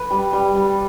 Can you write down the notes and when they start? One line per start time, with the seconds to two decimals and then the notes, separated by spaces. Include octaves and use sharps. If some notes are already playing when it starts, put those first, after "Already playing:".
Already playing: B4
0.10 G3
0.33 G3
0.55 G3